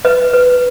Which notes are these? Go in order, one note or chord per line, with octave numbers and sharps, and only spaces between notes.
B4 D#5
B4